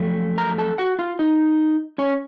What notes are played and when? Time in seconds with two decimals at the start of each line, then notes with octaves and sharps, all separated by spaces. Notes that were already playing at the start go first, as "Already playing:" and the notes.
Already playing: F#2 F3 A3
0.38 A#4 A#5
0.58 A4 A5
0.78 F#4 F#5
0.99 F4 F5
1.19 D#4 D#5
1.98 C#4 C#5